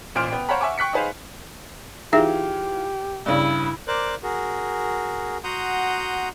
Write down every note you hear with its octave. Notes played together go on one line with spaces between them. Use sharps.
A1 A#2 C5 F6 D7
B3 G5
C5 C#5 F5 F#5 A#5 B5
E5 F#5 G#5 C#6 D6
G5 C#6 F#6 B6 C#7
D#4 G#4 B4 C5 F5
E3 D#4 F4 G4 G#4 E5
G2 C#3 D4 E4
A#4 C5 D5 D6 F#6
F#4 G#4 A#4
F#4 F#5 A#5 C6 D#6 G6